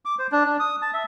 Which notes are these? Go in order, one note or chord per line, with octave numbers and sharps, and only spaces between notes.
D6
C5
D4
D4
D#6
A5
E5